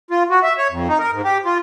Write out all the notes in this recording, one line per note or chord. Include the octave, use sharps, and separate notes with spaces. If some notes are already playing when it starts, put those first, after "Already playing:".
F4
F#4
E5
C#5
F2
D#4
A#4
G#2
G4
F4